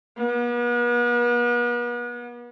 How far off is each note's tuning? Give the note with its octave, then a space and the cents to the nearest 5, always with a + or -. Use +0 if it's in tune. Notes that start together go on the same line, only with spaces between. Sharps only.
B3 -40